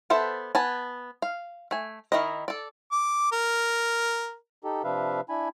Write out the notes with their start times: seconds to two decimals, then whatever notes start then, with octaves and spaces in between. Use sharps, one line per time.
0.10 B3 A4 C5 E5 A5
0.55 B3 G#5 A5
1.22 F5
1.71 A3 G#5
2.12 D#3 C4 E4 A#4 D#5
2.48 A4 D5
2.92 D6
3.32 A#4
4.64 D#4 G4 A4
4.84 C3 F3 D4 B4 E5 F5
5.29 D4 E4 G#5 B5